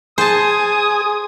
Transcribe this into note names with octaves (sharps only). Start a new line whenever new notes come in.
G#4 C5 G#5 A5 D#6